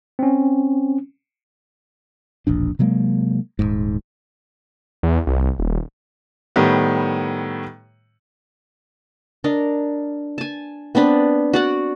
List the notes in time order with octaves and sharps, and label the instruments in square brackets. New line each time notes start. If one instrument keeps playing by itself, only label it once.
[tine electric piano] C4 C#4
[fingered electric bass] E1 A#1 D4
C3 F#3 G#3 A#3
D#1 G#1 G#2
[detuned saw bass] E2
C2
D#1
[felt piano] A2 D#3 G3 B3
[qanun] D4 A#4 D#5
G#5 A5
B3 C4 D4 B4
F#4 D5 F#5